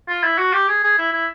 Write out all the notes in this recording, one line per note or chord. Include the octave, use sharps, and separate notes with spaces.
F4
E4
F#4
G4
G#4
G#4
E4
E4